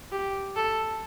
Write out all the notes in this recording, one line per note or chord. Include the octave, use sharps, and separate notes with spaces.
G4
A4